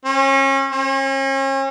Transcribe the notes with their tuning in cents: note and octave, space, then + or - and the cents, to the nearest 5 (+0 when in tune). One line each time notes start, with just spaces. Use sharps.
C#4 -35
C#4 -40